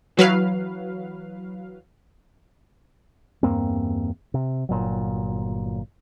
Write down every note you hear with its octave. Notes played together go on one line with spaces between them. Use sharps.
E3 F#3 B4 F5
E2 G2 A#3 C4
C3
G1 A#2 F#3